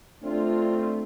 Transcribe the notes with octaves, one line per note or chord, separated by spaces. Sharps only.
A3 C4 D4 F4